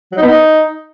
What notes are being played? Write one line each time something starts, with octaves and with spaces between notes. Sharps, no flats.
F#3
D#4
B3
D#4